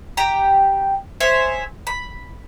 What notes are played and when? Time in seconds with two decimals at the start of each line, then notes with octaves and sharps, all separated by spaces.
0.17 G4 G5 A#5
1.20 G#4 C5 C#5 E5
1.87 B5